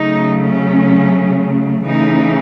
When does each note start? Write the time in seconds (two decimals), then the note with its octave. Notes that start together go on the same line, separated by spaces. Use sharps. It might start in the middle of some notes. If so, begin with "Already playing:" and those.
Already playing: C#3 F#3 A3 D#4
0.41 C#4
1.85 C#3 E3 A3 D#4